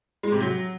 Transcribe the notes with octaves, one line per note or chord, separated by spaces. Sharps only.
G#3
C3
F#3